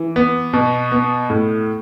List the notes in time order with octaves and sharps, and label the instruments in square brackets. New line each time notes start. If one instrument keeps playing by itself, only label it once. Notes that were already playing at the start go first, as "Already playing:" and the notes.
Already playing: [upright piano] E3
B3
B2
B3
A2